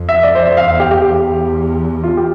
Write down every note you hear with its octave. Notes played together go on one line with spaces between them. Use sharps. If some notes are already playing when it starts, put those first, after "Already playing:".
Already playing: F2
E5
D5
C5
E5
F5
E2 F5
G4
G4
G4
F4
G4